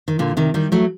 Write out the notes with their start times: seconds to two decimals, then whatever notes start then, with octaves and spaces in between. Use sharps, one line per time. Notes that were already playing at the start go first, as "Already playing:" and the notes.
0.08 D#3
0.19 A#2 D3
0.37 C3 D#3
0.54 D#3 G3
0.72 F#3 A3